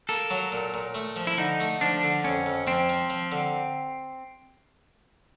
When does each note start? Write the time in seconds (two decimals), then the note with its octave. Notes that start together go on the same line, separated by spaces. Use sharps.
0.09 A#3 A4
0.30 F#3
0.52 A#2
0.74 A#2
0.94 A3
1.16 F3
1.27 E4
1.38 D3 D#4
1.60 A3
1.81 F3 D4
2.03 D3
2.24 F2 C#4
2.46 F2
2.67 F3 C4
2.89 F3
3.10 F3
3.32 D3